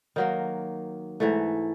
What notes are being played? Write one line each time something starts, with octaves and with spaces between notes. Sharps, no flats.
D#3 F#3 A#3
G#2 E3 A3